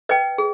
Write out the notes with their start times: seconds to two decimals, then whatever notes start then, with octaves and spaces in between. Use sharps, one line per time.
0.09 B4 D#5 G5
0.38 G#4